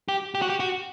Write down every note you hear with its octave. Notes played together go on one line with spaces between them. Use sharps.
G4
G4
F#4
G4
F#4